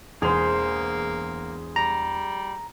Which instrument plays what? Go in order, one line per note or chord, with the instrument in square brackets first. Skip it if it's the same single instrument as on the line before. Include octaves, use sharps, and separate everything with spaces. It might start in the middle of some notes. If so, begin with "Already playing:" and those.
[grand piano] E1 E2 F7 [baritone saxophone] A#3 [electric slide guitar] G#4 C5
[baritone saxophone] G3 [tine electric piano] A#5